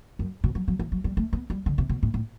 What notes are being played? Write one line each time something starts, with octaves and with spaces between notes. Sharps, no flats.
F#2
B2
F#3
F#3
E3
F#3
G3
A3
B3
G3
D3
C3
B2
A2
A2